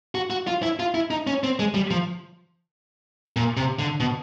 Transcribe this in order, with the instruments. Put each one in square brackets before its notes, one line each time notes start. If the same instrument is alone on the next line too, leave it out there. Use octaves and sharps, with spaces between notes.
[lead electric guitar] F#4
F#4
F4
E4
F4
E4
D#4
C#4
C4
G#3
G3
F3
A#2
C3
D3
B2